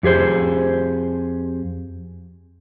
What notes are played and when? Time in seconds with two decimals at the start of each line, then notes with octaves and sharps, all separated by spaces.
0.03 F2 G4 G#4 C5